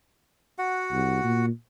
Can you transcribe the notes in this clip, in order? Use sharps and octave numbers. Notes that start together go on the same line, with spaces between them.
F#4 F#5
C2
A#2